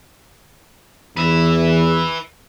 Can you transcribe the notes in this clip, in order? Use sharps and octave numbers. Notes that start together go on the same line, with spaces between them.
E2 B4 E5